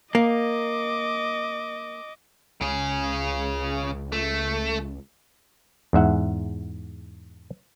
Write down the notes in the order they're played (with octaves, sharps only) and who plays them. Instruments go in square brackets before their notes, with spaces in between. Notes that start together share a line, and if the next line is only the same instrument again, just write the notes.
[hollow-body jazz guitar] A#3 [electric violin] D#5 D6
[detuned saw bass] C#2 [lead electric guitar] C#3 G#4
[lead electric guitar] A3
[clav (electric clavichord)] E2 G#2 E5 F#5